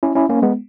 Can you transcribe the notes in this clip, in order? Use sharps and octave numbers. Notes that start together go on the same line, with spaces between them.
C#4 E4
C#4 E4
A#3 C#4
G#3 B3